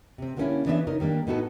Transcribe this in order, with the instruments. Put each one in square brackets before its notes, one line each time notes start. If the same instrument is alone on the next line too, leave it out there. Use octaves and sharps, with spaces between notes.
[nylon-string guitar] C3 C4
D3 G3 A#3 B3 C#4 E4
E3 B3 D4 G#4 D5 E5
C#3 D#4 A#4
D#3 G3 A#3 D4
A2 B3 D#4 F#4 G#4 A4